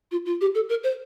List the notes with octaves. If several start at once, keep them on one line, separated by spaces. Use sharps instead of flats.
F4
F4
G4
A4
A#4
C5